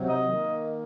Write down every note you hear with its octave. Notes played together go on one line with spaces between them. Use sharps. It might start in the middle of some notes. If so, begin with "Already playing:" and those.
Already playing: C3 F#3
D#5
D#3 A#3